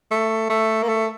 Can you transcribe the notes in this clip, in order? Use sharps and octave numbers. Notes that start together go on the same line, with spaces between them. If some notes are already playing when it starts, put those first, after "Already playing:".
A3
A3
A#3
A3